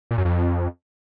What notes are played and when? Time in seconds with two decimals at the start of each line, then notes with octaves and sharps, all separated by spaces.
0.11 A#2
0.18 F#2
0.25 F2